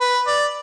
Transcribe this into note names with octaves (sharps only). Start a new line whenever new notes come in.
B4
D5